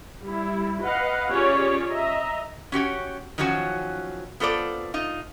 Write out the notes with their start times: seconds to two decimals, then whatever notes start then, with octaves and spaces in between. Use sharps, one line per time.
0.24 G3 E4
0.84 B4 D#5 F5 F#5
1.31 C#4 F4 G4 G#4 C#5 D5
1.91 D#5 E5 A#5
2.72 C#4 F#4 G4 C#5
3.38 D#3 F3 F#3 C#4 F#4
4.40 B3 F4 A4 C5 D5
4.94 D#4 F4